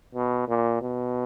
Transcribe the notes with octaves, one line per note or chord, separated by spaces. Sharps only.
B2
A#2
B2